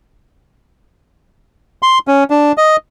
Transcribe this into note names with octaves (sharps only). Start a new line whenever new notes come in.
C6
C#4
D4
D#5